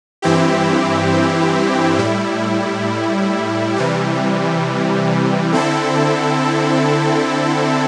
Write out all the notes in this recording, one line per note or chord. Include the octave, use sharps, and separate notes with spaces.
G2 E3 C4 E4 G4
A2 G3 E4
C3 E3 G3
D3 C4 E4 A4